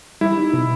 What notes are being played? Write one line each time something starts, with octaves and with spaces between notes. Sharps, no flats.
G3 E4
D#4
B2